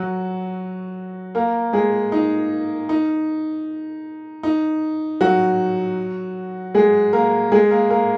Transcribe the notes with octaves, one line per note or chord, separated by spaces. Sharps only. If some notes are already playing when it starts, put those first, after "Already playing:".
Already playing: F#3 F#4
A#3 A#4
G#3 G#4
D#4
D#4
D#4
F#3 F#4
G#3 G#4
A#3 A#4
G#3 G#4
A#3 A#4
A#3 A#4